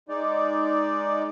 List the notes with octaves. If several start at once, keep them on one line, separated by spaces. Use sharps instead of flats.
G#3 D#4 D5